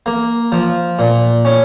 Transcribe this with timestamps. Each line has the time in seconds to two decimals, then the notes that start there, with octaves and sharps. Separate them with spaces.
0.06 A#3
0.52 F3
0.99 A#2
1.45 C#4